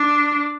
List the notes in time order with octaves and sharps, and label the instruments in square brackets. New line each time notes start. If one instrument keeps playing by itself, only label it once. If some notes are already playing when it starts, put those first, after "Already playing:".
Already playing: [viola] D4